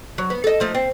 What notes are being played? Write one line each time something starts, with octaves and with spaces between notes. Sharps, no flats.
F#3
B3
A4 D#5
F3 A3 D#4
C4